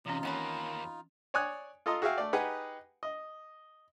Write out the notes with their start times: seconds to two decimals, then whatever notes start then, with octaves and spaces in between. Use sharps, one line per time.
0.06 C3 E3 C4 C#4 D#4 F4
0.23 D#2 A#3 B3 C#4 B4 D#5
1.34 C#5 D5 G#5 D#6 F#6
1.86 F4 A4 D#5 A#5 C6 D#6
2.02 F#4 G#4 E5 F5 G5
2.18 A3 D5
2.33 D#4 G4 G#4 B4 F#5 G#5
3.03 D#5